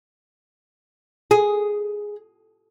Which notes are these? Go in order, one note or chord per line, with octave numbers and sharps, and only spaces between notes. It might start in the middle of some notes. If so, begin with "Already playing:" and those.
G#4